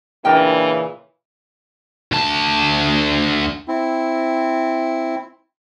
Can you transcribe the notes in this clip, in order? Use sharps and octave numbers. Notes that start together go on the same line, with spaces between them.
A#2 C#3 E3 D4 A#4 G5
D2 A5
C4 E4